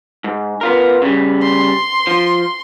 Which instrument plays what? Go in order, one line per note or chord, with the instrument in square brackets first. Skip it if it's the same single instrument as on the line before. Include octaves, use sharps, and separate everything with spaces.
[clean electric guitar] G#2
B3 F4 A#4
C#3 G3
[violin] C6
[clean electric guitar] F3